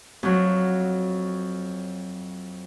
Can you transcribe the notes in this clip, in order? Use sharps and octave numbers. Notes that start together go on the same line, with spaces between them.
F2 F#3